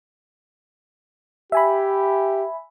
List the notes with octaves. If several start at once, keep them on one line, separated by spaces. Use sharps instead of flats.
G4 E5 G#5 B5